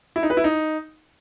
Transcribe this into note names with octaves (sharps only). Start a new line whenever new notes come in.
E4
D#4
B4
E4
D#4